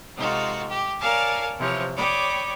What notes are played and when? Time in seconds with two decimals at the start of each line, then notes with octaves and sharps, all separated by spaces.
0.15 C3 G#3 D#4 F4 F#4 A4
0.69 G4
0.99 A#4 C#5 D5 F5 G#5 A5
1.58 C3 E3 F3 C#5
1.96 C#5 D5 G5 B5 D6 D#6